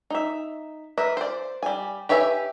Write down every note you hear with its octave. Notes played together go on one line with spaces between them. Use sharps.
D#4 E5
A#4 B4 E5
C5 D5
G3 G#5
G4 B4 C#5 E5 G#5